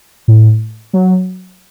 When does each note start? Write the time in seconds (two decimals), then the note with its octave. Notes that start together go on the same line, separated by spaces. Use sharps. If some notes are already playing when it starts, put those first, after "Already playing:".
0.28 A2
0.93 F#3